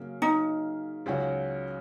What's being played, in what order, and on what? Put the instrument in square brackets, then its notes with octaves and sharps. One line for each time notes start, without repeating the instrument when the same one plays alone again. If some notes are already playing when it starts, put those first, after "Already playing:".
Already playing: [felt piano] C#3 F#3 A#3
[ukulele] D#4
[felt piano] C#2 C#3 F#3 C#4 F#4